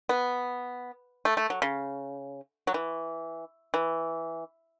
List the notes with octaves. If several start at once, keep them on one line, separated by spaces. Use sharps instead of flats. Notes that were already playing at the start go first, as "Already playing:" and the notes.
B3
A3
A3
F#3
C#3
F#3
E3
E3